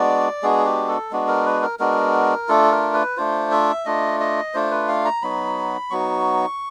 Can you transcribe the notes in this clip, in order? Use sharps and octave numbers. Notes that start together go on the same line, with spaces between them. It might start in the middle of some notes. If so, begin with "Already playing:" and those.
Already playing: G#3 B3 D4 F#4 D5
G#3 B3 D4 F#4 G#4
G4
A4
G#3 B3 D4 F#4
A#4
B4
A#4
G#3 B3 D4 F#4 A#4
A3 D4 F4 A4
A#4
B4
A3 D4 F4 C5
E5
A3 D4 F4 D#5
D#5
A3 D4 F4 C5
B4
F5
A#5
F#3 B3 D#4 F#4 B5
F#3 B3 D#4 F#4 C#6